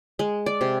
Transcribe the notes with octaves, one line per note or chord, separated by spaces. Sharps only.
G#3
D5
C3